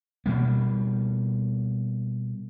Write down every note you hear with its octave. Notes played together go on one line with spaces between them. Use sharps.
B2 G3 A#3